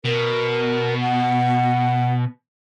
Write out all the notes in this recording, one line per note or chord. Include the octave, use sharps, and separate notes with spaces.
B2 A#4
F#5